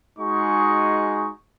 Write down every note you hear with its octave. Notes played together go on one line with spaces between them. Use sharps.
G#3 D#4 F#4 G#4 C#6